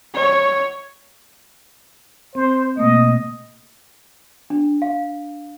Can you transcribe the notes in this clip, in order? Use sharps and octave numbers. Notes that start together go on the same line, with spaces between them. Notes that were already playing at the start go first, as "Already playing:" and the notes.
C#5
C4 C5
B2 A3 A#3 D#5
D4
F5